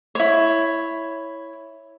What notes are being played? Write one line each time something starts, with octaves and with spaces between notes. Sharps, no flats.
E4 C#5